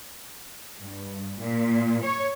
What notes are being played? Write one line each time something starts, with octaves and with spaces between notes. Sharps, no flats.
G2
A#2
C#5